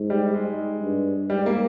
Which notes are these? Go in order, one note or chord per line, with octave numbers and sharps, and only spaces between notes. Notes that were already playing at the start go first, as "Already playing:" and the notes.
Already playing: G#2
G3
G#3
G2
G#2 G3
A#3